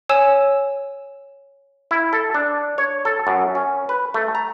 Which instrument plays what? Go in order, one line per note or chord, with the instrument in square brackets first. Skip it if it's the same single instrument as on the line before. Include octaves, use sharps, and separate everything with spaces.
[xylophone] C#5 G#5 E6 E7
[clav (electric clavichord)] E4
A4
D4
C#5
A4
F#2
C#4
B4
A3
A#5